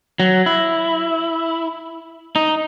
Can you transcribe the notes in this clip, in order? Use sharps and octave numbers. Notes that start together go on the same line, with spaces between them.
F#3
E4
D#4